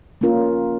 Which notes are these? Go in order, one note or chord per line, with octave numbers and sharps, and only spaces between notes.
A#3 C#4 F4 A#4